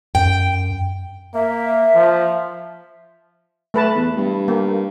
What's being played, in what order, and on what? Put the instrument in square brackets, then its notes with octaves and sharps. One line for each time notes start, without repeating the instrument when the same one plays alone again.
[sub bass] F#2 [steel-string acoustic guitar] G5
[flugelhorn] A#3 [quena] E5
[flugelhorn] F3
[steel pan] A3 B4 A5
[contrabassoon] E2
G2
[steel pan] A#3